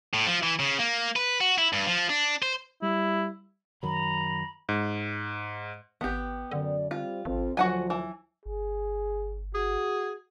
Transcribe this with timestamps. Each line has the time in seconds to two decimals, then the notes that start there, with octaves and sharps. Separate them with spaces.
0.14 A2
0.26 F3
0.43 E3
0.59 C#3
0.79 A#3
1.16 B4
1.41 F#4
1.58 E4
1.73 G2
1.86 F3
2.09 D4
2.42 C5
2.82 G3 E4
3.83 F#2 D#3 F#3 A#5 B5
4.69 G#2
6.01 G#1 B3 G4
6.51 F#2 D3 D5
6.91 G3 C4 F4 G4
7.25 G#1 F2 F3 C4
7.57 D2 F3 F#3 F#4 F#5 G#5
7.90 E3
8.46 G1 G#4
9.54 F#4 G#4